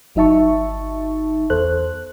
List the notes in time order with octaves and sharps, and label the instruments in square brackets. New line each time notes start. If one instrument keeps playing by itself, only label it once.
[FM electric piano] G1 F#3 D#4 E5 A5 C#6
E2 A4 C5 F#6